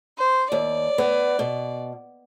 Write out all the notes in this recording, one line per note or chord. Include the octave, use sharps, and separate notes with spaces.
C5
D#2 D5
B3
B2